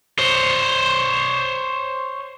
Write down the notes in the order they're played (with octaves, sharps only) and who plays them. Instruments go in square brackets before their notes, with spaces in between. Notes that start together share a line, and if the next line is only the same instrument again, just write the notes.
[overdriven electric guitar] C5 C#5